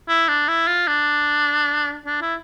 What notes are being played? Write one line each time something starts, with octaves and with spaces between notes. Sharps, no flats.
E4
D4
E4
F4
D4
D4
E4